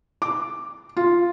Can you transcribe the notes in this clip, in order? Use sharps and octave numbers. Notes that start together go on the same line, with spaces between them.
D6
F4